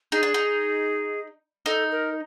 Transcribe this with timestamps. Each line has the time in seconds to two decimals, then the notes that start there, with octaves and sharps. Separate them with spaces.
0.12 D#4 G#4
0.23 D4
0.34 D#4
1.66 D#4 A4
1.92 A#4